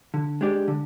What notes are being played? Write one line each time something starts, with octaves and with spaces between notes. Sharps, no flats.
D3
G#3 D4 G4 D5
D3